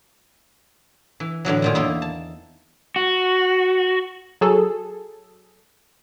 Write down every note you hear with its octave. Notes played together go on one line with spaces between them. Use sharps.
E3
A2 D3 E3 F#3
F#2 A#2 D#3
E2 A#3 D#4 E4
A5
F#4
F#3 G#4 A4